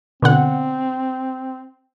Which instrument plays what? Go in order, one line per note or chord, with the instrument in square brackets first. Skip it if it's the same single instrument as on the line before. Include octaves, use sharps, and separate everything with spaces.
[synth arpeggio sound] B2 D3 F#5 [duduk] C4